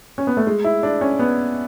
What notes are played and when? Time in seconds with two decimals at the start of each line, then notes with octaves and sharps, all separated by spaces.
0.18 C#4
0.27 B3
0.37 A3
0.47 G#3
0.64 E4
0.83 D4
1.01 C#4
1.19 B3